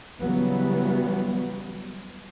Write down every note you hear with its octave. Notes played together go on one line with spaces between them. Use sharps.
C#3 E3 F#3 G3 B3